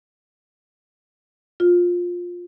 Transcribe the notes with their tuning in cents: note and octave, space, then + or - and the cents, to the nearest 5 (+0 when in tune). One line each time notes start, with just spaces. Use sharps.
F4 +15